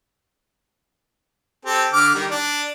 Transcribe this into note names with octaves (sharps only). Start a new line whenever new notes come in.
C4 G4 A4
D3 D6 F6
D#3 G3
D4